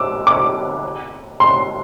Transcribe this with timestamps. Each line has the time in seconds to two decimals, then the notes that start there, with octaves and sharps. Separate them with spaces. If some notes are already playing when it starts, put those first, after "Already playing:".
Already playing: D6 E6
0.27 D6
1.40 C6